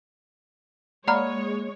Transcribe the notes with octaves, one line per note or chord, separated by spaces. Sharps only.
G#3 A#3 C#5 D5 F#5 A#5 B5 F6